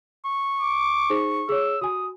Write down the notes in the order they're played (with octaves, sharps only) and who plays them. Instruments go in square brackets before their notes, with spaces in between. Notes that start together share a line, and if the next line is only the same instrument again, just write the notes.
[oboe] C#6
[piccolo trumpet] D6
[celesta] D#4 G#4 C5
[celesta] G#4 C#5 [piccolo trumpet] E6
[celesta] F#4 G#5 [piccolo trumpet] D#6